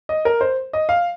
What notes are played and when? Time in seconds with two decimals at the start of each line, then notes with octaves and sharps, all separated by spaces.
0.09 D#5
0.25 A#4
0.41 C5
0.73 D#5
0.89 F5